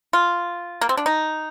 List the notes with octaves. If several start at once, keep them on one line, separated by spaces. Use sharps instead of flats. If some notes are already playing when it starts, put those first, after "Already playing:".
F4
A#3
C4
D4
D#4